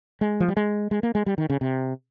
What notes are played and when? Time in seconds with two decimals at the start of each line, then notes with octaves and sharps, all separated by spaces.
0.21 G#3
0.40 F3
0.48 G3
0.57 G#3
0.91 G#3
1.03 A#3
1.15 G#3
1.26 G3
1.38 D#3
1.50 C#3
1.61 C3